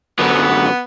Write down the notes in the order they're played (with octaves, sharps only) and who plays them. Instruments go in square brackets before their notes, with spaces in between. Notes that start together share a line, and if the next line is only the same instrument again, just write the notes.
[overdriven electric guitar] F#2 D3 [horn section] B3